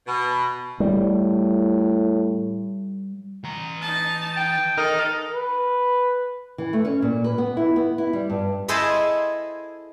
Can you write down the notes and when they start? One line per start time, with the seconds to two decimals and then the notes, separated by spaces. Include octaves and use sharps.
0.07 B2
0.80 A2 G3
3.44 E3 A#5
3.81 D#4 A5
4.36 G5
4.78 D#4 A4 A#4 D#5 F6
5.32 B4
6.58 E3
6.73 A3
6.85 C#4
7.02 A#2
7.24 B4
7.38 B3
7.57 E4
7.76 B3
7.98 E4
8.13 G3
8.30 G2
8.68 E4 G#4 A4 C5 D#5 A5